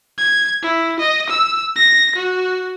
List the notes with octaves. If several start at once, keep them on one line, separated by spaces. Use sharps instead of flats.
G#6
E4
D#5
E6
A#6
F#4